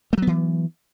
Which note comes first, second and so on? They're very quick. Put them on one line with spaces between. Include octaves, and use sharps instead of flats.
A3 F#3 B3 E3